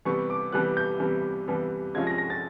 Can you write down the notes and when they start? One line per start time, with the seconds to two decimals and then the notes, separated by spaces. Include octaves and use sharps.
0.05 C3 E3 G3 B3 C#6
0.30 D6
0.52 C3 E3 G3 B3 F#6
0.77 G6
1.00 C3 E3 G3 B3
1.48 C3 E3 G3 B3
1.94 C3 F3 G#3 C#4 F4 G#6
2.07 A#6
2.18 A#6
2.30 A6